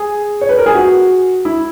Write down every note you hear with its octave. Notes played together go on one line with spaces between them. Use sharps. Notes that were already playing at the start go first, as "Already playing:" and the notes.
Already playing: G#4
C#5
B4
A#4
G#4
F#4
E4